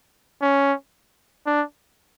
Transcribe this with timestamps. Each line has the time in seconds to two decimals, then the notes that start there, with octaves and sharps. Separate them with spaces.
0.42 C#4
1.47 D4